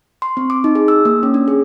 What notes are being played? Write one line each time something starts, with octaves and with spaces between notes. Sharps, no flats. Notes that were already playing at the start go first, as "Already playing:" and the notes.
C6
C4
D6
D#4
G#4
E6
A#3
C#4
D4
G#4